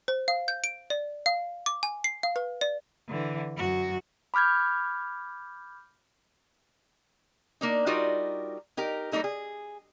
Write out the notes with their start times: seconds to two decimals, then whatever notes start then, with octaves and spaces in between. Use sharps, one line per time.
0.08 C5
0.28 F5
0.48 G6
0.64 D7
0.90 D5
1.26 F5
1.66 D6
1.83 G#5
2.04 C7
2.23 F5
2.36 B4
2.61 D5
3.08 D3 E3
3.57 F#2 F#4
4.34 B5 D6 F6 G6 G#6
7.61 A#3 D4 D#4
7.86 G3 D#4 F4 F#4 A#4 D5
8.77 D#4 G4 A#4
9.12 G3 A#3 D#4 A4
9.24 G#4